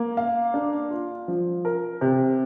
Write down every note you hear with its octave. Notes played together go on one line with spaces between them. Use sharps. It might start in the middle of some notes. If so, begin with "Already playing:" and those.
Already playing: A#3
F5
D4
F4
F3
A#4
C3